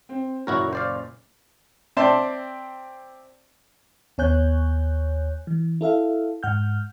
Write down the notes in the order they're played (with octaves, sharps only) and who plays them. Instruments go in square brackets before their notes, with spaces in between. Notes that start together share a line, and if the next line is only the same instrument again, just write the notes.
[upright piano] C4
[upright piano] F#1 A#2 C#5 [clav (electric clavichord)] E4 F#4 A#4
[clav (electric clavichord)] C5 D5 F5
[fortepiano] C4 D5 E5 A5 C6
[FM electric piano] D#2 B3 C#5 G#5 F#6 G6
E3
E4 A4 E5 F5
G#2 F#5 F6 G6